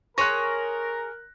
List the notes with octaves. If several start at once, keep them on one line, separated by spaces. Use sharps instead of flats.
G#4 A#4 C#5 C6 C#6 F#6 A#6